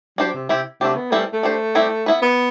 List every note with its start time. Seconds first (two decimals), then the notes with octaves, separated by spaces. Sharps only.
0.18 F#3 D4 G4 C5
0.34 C3
0.49 C3 C4 E4 G4
0.81 C3 F#3 A3 D4 G4
0.96 B3
1.12 E3 G3 A3 C4 E4
1.33 A3
1.43 D4 G4 C5
1.75 G3 C4 E4 G4
2.06 B3 E4 B4
2.22 B3